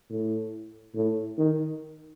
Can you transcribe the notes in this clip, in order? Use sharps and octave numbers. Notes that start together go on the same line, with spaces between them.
A2
A2
D#3